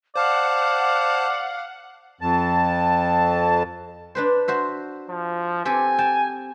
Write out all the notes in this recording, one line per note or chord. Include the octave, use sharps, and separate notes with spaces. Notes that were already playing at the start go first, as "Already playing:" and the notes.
C5 D5 F5 F#5 A5
F2 A5
D4 B4 C5
F#4 C5 E5
F3
C4 G4 A4 G#5
G5 A5